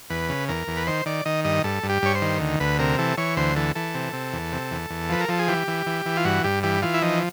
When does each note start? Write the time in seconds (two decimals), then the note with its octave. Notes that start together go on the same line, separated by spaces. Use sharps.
0.10 E2 B4
0.29 C#3
0.49 E2 A#4
0.68 E2
0.77 B4
0.87 D#3 C5
1.06 D#3 D5
1.26 D#3 D#5
1.44 G2 D#5
1.64 G2 A4
1.83 G2
1.89 G4
2.02 G2 C#5
2.15 C5
2.22 D#3
2.40 D2
2.60 D2 B4
2.79 C3 A#4
2.98 E3 A4
3.17 E3 C#5
3.37 D2 C5
3.56 E3 A4
3.75 E3 A4
3.95 C3
4.13 C3
4.33 E2
4.52 C3
4.71 E2
4.90 E2
5.09 F3 B4
5.21 A#4
5.29 F3 A4
5.39 G#4
5.48 E3 G4
5.68 E3
5.86 E3
6.06 E3
6.17 F4
6.25 G2 F#4
6.44 G2 G4
6.63 E3 G4
6.82 E3 F4
6.94 E4
7.02 F3 D#4